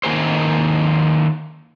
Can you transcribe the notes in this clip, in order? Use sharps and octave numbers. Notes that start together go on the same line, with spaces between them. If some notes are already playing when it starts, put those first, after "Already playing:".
D#3 A#3 G#4 C5